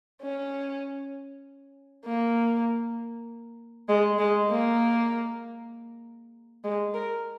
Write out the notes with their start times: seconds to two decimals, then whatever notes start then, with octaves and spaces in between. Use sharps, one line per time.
0.22 C#4
2.05 A#3
3.89 G#3
4.18 G#3
4.50 A#3
6.64 G#3
6.94 A#4